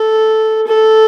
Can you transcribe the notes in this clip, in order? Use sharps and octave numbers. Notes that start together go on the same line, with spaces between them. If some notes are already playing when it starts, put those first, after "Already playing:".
Already playing: A4
A4